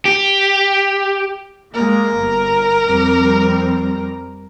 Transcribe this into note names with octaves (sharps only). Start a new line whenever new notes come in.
G4
G#3 A#3 A#4
G1
F2 G3 C4